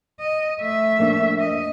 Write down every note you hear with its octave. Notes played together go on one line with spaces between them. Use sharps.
D#5
A3 E5
F2 A#3 D4
D#5